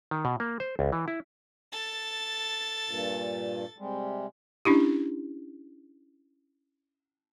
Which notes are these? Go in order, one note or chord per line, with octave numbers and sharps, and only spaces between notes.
D#3
B2
A#3
C5
C#2
E3
E4
A4 A6
G2 A#2
C3 G3 G#3
C#4 D4 E4 G4